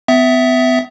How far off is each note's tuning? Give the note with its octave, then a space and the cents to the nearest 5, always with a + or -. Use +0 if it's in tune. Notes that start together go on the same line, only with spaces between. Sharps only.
B3 +35 E5 +0